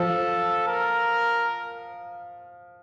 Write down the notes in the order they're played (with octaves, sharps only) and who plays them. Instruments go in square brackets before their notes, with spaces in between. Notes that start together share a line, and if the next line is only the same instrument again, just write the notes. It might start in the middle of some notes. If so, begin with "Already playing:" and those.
Already playing: [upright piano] F3 [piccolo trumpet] A4
[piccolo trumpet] A#4